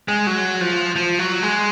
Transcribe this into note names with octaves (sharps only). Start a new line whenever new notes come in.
G#3
F#3
F3
F3
F#3
G#3